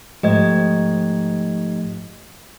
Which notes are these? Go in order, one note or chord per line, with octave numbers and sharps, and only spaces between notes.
G#2 F3 A3 G4 D#5 G#6